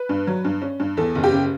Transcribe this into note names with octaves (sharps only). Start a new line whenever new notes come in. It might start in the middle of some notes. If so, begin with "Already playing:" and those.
Already playing: B4
G2
F#3
G2
C#4
G2
E2 A4
F#1
G4
C#3